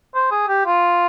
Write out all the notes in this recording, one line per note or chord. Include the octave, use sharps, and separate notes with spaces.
C5
G#4
G4
F4